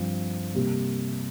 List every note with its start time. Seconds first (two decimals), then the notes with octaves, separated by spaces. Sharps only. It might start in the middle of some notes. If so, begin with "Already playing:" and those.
Already playing: G2 F3 C4
0.54 C3 G3 A#3